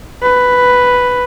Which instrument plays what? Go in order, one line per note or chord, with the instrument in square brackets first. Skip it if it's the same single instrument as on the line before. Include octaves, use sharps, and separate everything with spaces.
[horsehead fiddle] B4